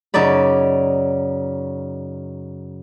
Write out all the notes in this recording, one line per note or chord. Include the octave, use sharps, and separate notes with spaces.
F#2 C#3 D#4 D5 B5